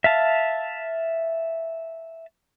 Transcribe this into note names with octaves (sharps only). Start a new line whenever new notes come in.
E5 F5 A5